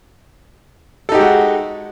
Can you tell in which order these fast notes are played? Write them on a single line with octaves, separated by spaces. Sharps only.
A4 D#4 G4 G#3 F#4